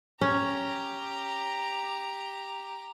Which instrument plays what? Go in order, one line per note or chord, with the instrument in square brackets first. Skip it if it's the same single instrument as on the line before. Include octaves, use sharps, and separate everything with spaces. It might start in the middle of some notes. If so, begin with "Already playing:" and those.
[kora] C#4 [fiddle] G4 A#5